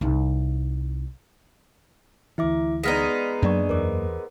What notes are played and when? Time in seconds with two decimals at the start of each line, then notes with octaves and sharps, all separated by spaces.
0.01 C2 D#4
2.38 D2 E3 E4 E5 D6
2.83 G#3 B3 D#4 D5 F6 B6
3.42 F#2 F#3 A#3 D4 D5 C#6
3.69 E2 A#4 C5 D6